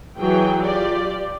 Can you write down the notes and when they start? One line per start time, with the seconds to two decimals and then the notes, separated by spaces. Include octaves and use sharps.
0.18 E3 F#3 F#4 G#4 G5
0.63 F4 G4 D5